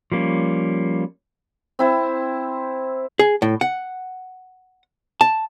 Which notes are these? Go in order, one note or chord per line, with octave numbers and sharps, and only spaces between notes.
F3 G3 A#3 C#4
C4 E4 C5
G#4
A2
F#5
A5